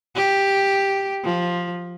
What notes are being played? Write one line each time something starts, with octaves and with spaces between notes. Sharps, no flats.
G4
F3